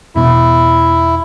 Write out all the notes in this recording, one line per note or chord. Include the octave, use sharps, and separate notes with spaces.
E1 B2 E4